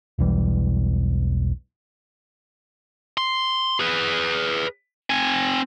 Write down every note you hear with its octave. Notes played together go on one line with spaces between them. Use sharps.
E1 B1 E3 G3
C6
G#4 B4
C4 G#5